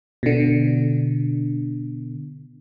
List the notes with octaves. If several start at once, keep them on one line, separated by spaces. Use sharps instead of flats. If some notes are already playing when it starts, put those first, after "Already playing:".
B2 D3